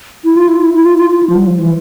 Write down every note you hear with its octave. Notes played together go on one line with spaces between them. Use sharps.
E4
F4
E4
E4
E4
F4
F4
F4
E4
F3
G3
F3
E3